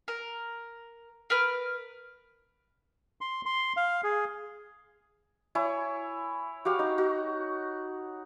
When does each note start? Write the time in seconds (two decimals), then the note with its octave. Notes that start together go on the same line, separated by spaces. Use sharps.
0.08 A#4
1.30 A#4 B4 F6
3.21 C6
3.45 C6
3.77 F5
4.04 G#4
5.55 E4 C#5 G#5
6.65 F#4 G4 F5
6.79 D#4
6.98 F#4